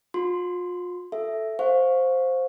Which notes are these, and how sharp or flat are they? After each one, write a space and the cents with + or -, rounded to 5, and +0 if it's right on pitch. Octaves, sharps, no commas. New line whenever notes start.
F4 +40 C6 +0
A4 +0 E5 +0
C5 +0 F5 +25 C#6 +0